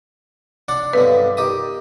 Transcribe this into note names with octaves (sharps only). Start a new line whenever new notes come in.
D4 F#5 D6
B1 G2 D3 B4
D#3 G4 D#6